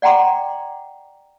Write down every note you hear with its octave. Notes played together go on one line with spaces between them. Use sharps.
D5 F#5 G5 A#5 C6 D6